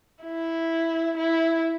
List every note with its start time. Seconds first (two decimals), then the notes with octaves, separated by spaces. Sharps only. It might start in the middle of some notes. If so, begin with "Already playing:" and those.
0.24 E4
1.17 E4